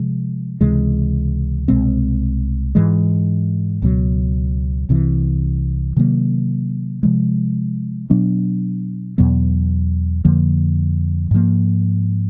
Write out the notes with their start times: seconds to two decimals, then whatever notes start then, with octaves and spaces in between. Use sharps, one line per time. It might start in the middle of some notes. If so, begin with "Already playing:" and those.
Already playing: C3 F3 G#3
0.60 C#2 C3 E3 G#3
1.68 C2 B2 G#3 C4
2.75 G#2 E3 G#3
3.82 C#2 B2 F#3
4.89 C2 C3 E3
5.96 C3 D#3 F#3 A#3
7.03 C3 F3 G#3
8.10 B2 F#3 B3 D4
9.18 E2 B2 F#3 B3
10.25 F2 D3 F3 A#3
11.31 G#2 F3 A#3